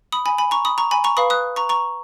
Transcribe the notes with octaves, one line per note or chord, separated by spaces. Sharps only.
B5 D#6
G#5 B5
G#5 B5
A#5 C#6
B5 D#6
A#5 C#6
G#5 B5
A#5 C#6
B4 F5 B5 D#6
D#6 F#6
A#5 C#6
A#5 C#6